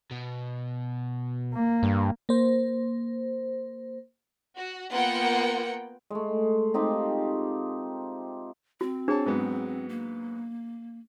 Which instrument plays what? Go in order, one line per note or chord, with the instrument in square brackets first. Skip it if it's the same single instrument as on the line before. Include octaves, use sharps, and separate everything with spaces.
[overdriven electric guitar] B2
[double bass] A#3
[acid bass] G2
[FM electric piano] A#3 C5
[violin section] F#4
A#3 B3 F4 F#5 G5 C#7
[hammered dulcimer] G#3 A3
C4 D#4 F4 G4
[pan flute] C4 [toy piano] F#4
[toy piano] D4 G#4 [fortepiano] C5 C#5 A5
[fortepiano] G#2 F#3 B3
[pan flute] A#3